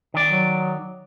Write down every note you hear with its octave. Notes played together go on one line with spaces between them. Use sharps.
D#3 D5
F#3